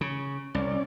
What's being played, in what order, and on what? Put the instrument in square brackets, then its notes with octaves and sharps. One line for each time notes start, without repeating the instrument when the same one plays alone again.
[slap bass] C#3
[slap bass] C2 [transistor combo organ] C#4 D5